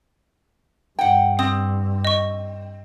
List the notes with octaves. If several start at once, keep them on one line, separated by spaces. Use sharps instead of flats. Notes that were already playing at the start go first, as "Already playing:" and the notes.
G2 F#5 G5
C4 D#6
D#5 C#6